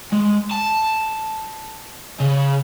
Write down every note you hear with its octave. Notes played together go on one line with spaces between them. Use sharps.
G#3
A5
C#3